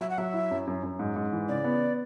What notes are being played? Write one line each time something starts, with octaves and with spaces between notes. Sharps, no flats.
F#3 E5
F#5
F#3 E5
E4
F#2
F#2
F#2
G#2
G#2
E3
C#3 D5
B3